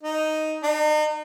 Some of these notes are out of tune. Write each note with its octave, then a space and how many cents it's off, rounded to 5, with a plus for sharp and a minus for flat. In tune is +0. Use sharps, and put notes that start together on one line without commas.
D#4 +0
D#4 -40